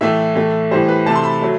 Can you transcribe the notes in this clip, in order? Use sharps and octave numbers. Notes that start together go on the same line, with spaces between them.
A2 E3 A3 E5
A2 E3 A3
A2 E3 G3 C5
B4
C3 E3 A3 A5
C6
B5
F#3 A3